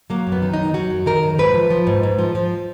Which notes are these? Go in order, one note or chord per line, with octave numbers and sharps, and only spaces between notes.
F#3 A#3
F#2
B3
D#3
F#2 D#4
F#3 F#4
F#2
D#3 A#4
F#2
G#2 B4
F3
F3
G#2
G#2
F3
F3